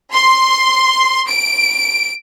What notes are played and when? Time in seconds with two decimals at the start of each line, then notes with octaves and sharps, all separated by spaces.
0.13 C6
1.29 D7